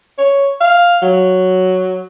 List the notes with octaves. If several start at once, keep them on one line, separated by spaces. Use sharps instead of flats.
C#5
F5
F#3